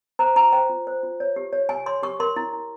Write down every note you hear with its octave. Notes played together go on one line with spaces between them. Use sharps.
C5 A#5
F4 A#5
C5 G5
F4
C5
F4
C#5
G4
C#5
G4 G#5
C#5 C6
G4 C#6
A#4 C6
E4
E4